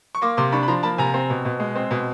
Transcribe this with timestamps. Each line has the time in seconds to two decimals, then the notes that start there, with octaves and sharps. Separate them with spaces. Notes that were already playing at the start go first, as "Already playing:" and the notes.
0.15 C#6
0.21 A#3 C6 D6
0.37 C3 C6 D6
0.52 D4 B5 C#6
0.63 B5
0.68 F3 A#5 C6
0.83 A#3 A5 B5
0.98 C3 G#5 A#5
1.14 C4
1.30 B2
1.45 B2
1.60 G#3
1.76 C4
1.91 B2